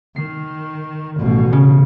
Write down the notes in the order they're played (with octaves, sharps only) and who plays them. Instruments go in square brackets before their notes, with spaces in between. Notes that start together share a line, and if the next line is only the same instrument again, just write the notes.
[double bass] D#3 [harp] C7
[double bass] A1 B2
[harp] C#3